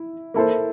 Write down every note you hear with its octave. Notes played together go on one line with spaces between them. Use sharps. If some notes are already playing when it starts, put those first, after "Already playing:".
Already playing: E4
A#3 E4 A4 C5